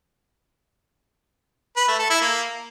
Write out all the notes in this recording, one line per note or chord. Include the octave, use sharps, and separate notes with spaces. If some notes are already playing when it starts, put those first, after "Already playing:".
B4
A3
A4
E4
A#3